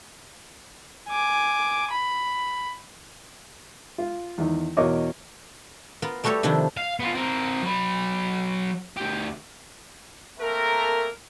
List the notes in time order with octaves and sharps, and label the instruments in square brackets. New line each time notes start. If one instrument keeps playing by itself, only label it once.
[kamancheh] G#5 D6
B5
[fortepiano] F4
E2 D#3
E2 B2 A#4 C#5 D#5 D6
[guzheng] B3 F4 A#4
G3 A3 F#4 G4 A4 C#5
C3 D#3 F3 D4 E4
[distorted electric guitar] F5
B3 F4
C4 A#4
F#3 B5
D2 G4
[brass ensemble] A3 A#3 C4 A4 A#4